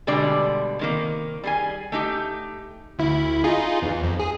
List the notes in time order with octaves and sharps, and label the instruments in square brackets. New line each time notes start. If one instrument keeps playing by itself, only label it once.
[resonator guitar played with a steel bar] B2 D3 G3 G#3 D5
C3 D#3 A#3
G3 G#4 G#5
A3 D#4 G4
[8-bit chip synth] D2 E4
D#4 F4 G#4
E2
F2
G#4